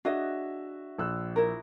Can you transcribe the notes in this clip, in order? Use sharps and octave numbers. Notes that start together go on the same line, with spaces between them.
D4 F#4 G#4 D#5 E5
A#1 E6 F#6
E4 A#4